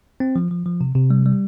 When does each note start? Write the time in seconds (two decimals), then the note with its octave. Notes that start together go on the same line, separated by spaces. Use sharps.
0.20 C4
0.36 F3
0.51 F3
0.66 F3
0.81 C3
0.95 C3
1.10 G3
1.26 G3